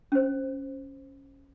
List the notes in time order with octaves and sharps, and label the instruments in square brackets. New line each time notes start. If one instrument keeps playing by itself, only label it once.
[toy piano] C#4 C5